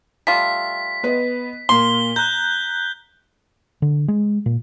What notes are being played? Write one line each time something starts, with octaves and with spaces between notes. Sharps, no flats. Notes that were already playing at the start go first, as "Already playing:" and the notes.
G3 A3 F4 B6
B3 B4 D#5
A#2 A#3 C6 G7
A#5 F#6 G6
D3
G#3
A#2